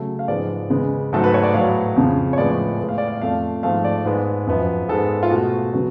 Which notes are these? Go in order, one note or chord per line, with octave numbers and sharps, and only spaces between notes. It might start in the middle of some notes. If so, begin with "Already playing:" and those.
Already playing: C#3 F#3 A3
F5
G#2 F3 G#3 B3 D5
C#3 G#3 B3
G#2 F#3 A3 A4
B4
C#5
D5
A2 F#3 B3 F5
F2 C#3 F3
C#5
A2 F3 G#3 B3 D5
A2 G#3 B3
F5
D5
F5
F2 F3 A3 F5
G#2 F3 A3 F5
D5
G#2 G#3 B3
F#2 F3 B3
G#2 G#3 B3 A4
F4
B2 A3 F#4
C#3 F#3 B3